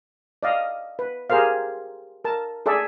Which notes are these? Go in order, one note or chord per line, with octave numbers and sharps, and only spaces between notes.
D5 D#5 F5
B4
G4 G#4 A#4 C5 F5
A#4 A5
G#4 A4 D5 E5